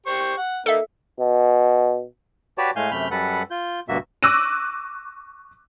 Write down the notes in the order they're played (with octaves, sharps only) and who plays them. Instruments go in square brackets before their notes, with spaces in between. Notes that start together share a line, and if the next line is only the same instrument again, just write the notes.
[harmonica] G4 C5 C#6
F#5
[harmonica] A#3 D#4 [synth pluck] A4 E5
[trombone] B2
[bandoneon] F#4 G4 B4 C#5 D5 A5
A2 G#3 A3 F5 G#5 G6
F#2 C3 A3 B5 F6 G6
F#2 G3 A4 B4 F#5
F4 G6
D2 G2 B2 A#3 F#4 E5
[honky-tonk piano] C#6 D6 E6 F#6 A#6 D#7